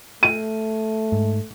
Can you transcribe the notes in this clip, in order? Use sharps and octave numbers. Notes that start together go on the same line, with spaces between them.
A3 D#7
G#2